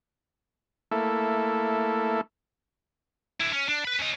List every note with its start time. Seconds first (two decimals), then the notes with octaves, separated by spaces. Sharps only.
0.91 A3 A#3 E4 A4
3.40 D3 E4
3.53 C#4
3.69 D4
3.85 B4 B5
3.99 C#4 D#5